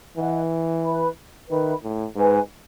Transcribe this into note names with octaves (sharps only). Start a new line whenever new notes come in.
E3 B4 D#5 F#5
B4 E5 B5
D#3 B4 E5 B5
A2
G#2 B4 D#5 G#5